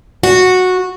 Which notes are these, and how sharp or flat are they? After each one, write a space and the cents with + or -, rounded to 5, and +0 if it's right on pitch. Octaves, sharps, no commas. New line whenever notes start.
F#4 -10